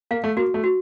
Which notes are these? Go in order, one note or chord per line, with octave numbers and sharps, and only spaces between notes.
A#3 F5
A3
A#3 F#4
A3
F#4